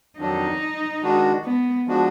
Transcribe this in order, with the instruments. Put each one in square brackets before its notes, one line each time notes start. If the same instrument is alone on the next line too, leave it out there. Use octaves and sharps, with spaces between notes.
[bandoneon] F2 D#3 F#3 D4 [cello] D#4
[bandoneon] D#3 G#3 D4 F#4
[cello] B3
[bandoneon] F3 G#3 D4 F#4